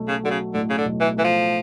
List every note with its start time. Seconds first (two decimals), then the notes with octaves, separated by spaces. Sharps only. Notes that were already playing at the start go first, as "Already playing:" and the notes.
Already playing: B1 A3
0.08 C#3
0.23 D3 F#3
0.31 C#3
0.54 A2 D3
0.70 C#3
0.78 D3
0.86 B1
1.01 E3
1.17 E3 A3
1.24 F3